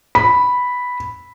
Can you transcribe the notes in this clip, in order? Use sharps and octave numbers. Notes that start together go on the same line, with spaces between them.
B5